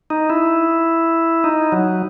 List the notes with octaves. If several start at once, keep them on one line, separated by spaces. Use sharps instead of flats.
D#4
E4
D#4
F#3